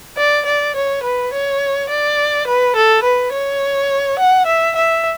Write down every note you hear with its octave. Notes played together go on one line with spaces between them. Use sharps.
D5
D5
C#5
B4
C#5
D5
B4
A4
B4
C#5
F#5
E5
E5